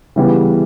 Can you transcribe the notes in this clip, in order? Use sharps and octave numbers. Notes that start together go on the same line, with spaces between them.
C#3 E3 G3 B3